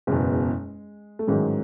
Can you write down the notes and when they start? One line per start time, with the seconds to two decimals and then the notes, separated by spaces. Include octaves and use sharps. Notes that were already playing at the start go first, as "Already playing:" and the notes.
0.07 F#1 E2 B2 G#3
1.19 A3
1.27 A1 G#2 D#3 F#3 G#3